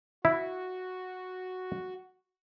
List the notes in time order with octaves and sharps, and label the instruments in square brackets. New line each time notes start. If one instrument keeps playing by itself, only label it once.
[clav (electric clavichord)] E4 [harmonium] F#4